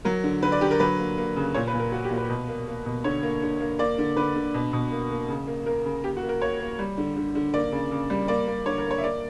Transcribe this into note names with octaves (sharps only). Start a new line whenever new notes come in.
F#3 A#4
D3
D3 B4
D5
D3 G4
A#4
F#3 B4
A#3
A#3
C#3
A#2 C#5
B4
A#2
A#4
A#3 F#4
G4
A#2
B4
B2
A#3
A#3
B2
D3 C#5
A#3
D3
A#3
A#3 D5
D3
D3 B4
D3
B2
B2
A#3
A#3
C#3
A#3
A#3 A#4
C#3
A#3 G4
F#4
A#3
A#4
A#3 C#5
A#3
G3
D3
D3
D3
A#3 D5
C#3
C#3
G3
A#3 D5
A#3
D3 C#5
A#4
A#3
C#5
E5
A#3 D5